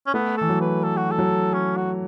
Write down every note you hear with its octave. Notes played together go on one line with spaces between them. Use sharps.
C#4
A3 B3
E3 A4
F#3
B4
A4
F#4
A4
F#3
C#4
F#4